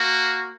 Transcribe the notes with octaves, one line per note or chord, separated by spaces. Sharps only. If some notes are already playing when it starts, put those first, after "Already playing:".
Already playing: A#3 F#4